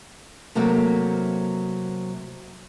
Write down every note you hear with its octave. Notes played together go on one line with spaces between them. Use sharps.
C3 F#3 A3 A#3 C4